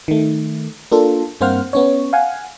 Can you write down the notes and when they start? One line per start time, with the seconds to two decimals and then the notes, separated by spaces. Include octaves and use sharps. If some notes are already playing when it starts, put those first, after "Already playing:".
0.08 D#3 A3
0.92 A#3 D4 F4 A4
1.41 G2 A#3 C4 C5 F#5 F6
1.73 B3 C#4 C#5
2.13 F5 F#5 G#5